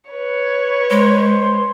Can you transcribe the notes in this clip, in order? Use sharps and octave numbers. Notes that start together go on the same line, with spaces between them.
B4 C#5
G#3 C5